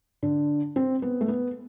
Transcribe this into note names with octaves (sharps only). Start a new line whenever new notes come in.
D3
C4
B3
A3
B3